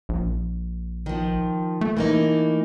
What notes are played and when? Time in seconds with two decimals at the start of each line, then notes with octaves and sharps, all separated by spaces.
0.09 A#1
1.06 D#3 F3
1.81 A3
1.97 E3 A#3 D#4